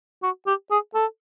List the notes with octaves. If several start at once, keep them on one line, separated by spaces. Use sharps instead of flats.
F#4
G4
G#4
A4